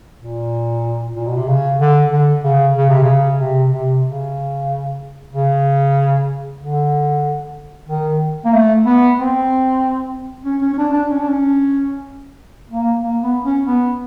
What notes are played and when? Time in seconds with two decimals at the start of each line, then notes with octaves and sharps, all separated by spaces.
0.20 A#2
1.16 A#2
1.27 B2
1.37 C3
1.48 C#3
1.80 D3
2.12 D3
2.44 C#3
2.76 C#3
2.89 C3
3.02 C#3
3.41 C3
3.72 C3
4.05 C#3
5.33 C#3
6.61 D3
7.89 D#3
8.45 A#3
8.53 A3
8.86 B3
9.18 C4
10.45 C#4
10.62 C#4
10.73 C#4
10.78 D4
10.93 D4
11.10 C#4
11.19 D4
11.28 C#4
12.70 A#3
13.02 A#3
13.23 B3
13.45 C#4
13.66 B3